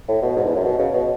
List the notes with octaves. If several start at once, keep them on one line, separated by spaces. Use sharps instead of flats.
A2
B2
G#2
E2
F#2
B2
C#3
B2